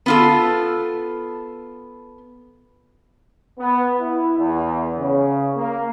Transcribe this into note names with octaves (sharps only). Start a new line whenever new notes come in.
B3 F4 A4
B3
E4
E2
C#3
A#3